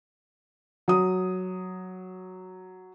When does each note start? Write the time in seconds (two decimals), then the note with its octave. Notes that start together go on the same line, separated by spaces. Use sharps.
0.88 F#3 D#6